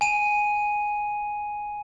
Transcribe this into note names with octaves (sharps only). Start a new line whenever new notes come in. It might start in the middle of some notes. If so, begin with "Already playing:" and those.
G#5 D#7